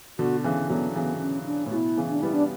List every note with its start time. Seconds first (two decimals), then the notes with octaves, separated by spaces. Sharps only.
0.19 B2 D3 F#4
0.44 C#3 E3 C#4
0.70 D3 F#3 B3
0.95 C#3 E3 B3
1.21 C#4
1.46 D4
1.66 A2
1.72 B2 E4
1.97 C#3 E3
2.10 D4
2.22 G3 B3 E4
2.33 D4